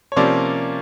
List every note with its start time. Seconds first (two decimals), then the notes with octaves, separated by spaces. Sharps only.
0.12 C#5
0.16 C3 F3 A#3 C#4 C5 D5